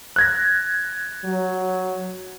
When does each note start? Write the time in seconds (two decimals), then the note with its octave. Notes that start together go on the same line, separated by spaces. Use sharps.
0.16 F#6 G#6 A#6
1.25 F#3